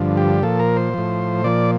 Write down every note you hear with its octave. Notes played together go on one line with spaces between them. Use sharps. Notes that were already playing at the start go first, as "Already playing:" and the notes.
Already playing: G2 D3 F3
G4
A#2 F3 A4
A#4
C5
A2 F3
A#2 F3 D5